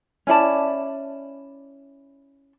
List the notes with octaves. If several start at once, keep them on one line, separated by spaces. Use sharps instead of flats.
C#4 E4 D5 A5